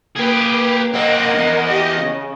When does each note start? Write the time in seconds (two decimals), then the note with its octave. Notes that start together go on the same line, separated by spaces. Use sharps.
0.16 A#3 G4 G#4 B4
0.94 A#3 C4 A#4 D#5 F#5
1.35 E2 G2
1.66 G4 D#5
2.00 C#3